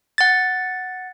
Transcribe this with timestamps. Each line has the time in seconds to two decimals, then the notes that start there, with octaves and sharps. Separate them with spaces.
0.18 F#5 A6